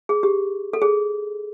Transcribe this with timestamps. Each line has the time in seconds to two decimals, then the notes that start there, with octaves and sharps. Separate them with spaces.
0.09 G#4
0.23 G4
0.73 A4
0.82 G#4